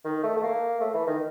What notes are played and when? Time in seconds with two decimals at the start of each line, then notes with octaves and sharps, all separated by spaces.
0.05 D#3
0.23 A3
0.37 A3
0.43 A#3
0.81 A3
0.94 E3
1.07 D#3